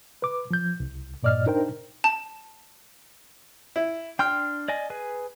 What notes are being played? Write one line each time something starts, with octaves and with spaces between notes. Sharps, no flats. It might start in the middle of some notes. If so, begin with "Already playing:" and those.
B4 D6
F3 G6
C2
G2 A#2 D5 D#5 F6
D4 D#4 A#4 C5 G5
A5
E4
D4 G5 C6 F6
D5 D#5 G#5
G#4 B4 G#5